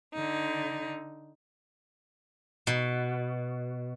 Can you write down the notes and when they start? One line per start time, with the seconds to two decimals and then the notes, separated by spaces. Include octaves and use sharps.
0.15 D3 D#4
2.67 B2